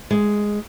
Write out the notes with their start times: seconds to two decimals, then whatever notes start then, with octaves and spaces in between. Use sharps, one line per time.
0.11 G#3